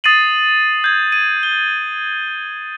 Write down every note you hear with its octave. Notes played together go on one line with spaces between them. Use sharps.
D#6 A6 C7 D#7 F#7
G6 G#6
D#7
G7